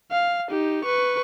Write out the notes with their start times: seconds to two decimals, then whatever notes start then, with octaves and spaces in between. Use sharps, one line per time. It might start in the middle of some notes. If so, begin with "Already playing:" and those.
0.11 F5
0.51 D#4 G4
0.85 B4 C#6